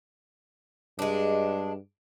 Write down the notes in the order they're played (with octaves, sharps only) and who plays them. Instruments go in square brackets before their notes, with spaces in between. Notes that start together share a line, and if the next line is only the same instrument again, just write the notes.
[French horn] G2 [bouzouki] G#3 D4